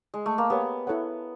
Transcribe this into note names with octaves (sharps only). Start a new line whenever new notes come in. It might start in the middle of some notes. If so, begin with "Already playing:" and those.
G#3
A3
A#3
B3 G4 A#4 C#5
E4 A4 C#5 F#5